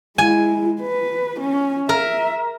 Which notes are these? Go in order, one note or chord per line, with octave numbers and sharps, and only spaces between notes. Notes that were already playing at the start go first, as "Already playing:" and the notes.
G#3 E4 G#5
B4
C#4
A#4 E5